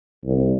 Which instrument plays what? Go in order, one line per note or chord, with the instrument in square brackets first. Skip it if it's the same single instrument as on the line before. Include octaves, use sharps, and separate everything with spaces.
[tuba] C2